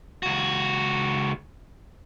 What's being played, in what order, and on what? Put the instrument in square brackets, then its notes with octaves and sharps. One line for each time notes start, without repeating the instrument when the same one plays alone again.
[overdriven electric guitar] C#2 F#4